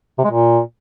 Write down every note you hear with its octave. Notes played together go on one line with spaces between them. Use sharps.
C3
G#3
A#2